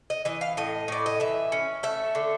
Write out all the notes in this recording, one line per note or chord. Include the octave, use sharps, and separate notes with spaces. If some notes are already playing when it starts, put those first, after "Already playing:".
D#5
E3 D#5
F5
A2 D#5
A2 D5
D#5
E3 E5
C#4
A3 E5
D3